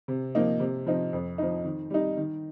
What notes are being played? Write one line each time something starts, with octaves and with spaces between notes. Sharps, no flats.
C3
F3 A#3 D#4
C3
F3 C4 D#4
F2
F3 D#4
D#3
G3 D#4
D#3